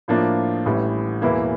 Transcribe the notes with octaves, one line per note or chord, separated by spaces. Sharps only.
A2 F3 A#3 D4 F4
A1 A2 E3 G3
E1 E2 E3 A#3 E4